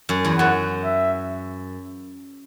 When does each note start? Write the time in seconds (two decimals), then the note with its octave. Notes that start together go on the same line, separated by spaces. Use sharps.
0.09 F#2
0.25 E2
0.38 F#2 F#5
0.85 E5